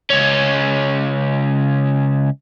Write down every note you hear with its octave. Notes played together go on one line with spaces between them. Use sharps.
C#2 C#4